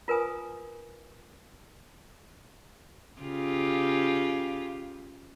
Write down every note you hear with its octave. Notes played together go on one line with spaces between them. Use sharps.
F4 A#4 B4 G#5 D#6
C#3 F4 G4